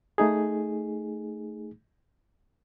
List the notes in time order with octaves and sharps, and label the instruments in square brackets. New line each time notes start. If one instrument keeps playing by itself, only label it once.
[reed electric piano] A3 D#4 G#4